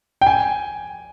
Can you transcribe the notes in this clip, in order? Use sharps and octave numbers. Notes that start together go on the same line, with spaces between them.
G5
G#5